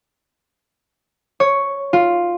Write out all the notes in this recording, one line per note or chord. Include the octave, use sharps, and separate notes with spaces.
C#5
F4